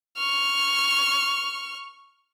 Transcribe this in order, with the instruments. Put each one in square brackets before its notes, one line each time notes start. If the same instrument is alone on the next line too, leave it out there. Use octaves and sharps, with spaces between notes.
[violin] C#6 F6